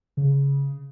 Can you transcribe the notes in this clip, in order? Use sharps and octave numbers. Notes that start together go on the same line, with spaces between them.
C#3